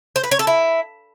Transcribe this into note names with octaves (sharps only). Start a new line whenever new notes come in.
C5
B4
C#5
A4
E4